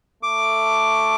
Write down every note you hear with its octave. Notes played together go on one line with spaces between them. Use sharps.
A3 D6